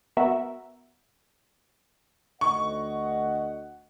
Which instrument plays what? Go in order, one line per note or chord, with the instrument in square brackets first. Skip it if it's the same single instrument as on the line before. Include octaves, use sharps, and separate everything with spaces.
[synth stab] B3 F#4 A#4 E5
[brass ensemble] D2 D#5 F#5 [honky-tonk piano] C#6